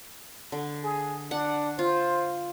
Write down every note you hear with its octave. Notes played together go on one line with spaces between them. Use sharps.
D3
G#4
D4 F#5
F4 C5